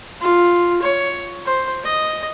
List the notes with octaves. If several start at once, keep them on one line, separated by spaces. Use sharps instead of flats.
F4
C#5
C5
D#5